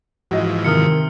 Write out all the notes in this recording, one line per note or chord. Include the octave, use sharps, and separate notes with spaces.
G#2 E3 F3 F#4 D#5
C3 D#3 D#6 F6 C#7